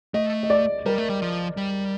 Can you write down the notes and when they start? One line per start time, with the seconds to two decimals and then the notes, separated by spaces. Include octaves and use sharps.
0.14 A3 D#5
0.43 D#5
0.50 D5
0.86 G3 A#4
0.98 A3
1.10 G3
1.22 F3
1.57 G3